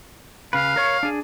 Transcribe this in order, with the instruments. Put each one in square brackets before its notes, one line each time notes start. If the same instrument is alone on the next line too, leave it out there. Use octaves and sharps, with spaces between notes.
[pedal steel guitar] C#3 B4 [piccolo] F5
[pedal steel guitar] A#4 C#5 C#6
D4 G#4